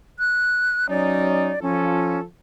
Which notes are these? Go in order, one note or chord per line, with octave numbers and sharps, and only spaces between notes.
F#6
F#3 C#4 D#4 D5
F3 C#4 F4 A4